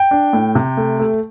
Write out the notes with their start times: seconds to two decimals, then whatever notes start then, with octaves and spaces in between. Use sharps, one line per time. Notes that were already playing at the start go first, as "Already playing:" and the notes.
Already playing: G5
0.11 D4
0.33 A2
0.55 C3
0.77 A3
0.99 A3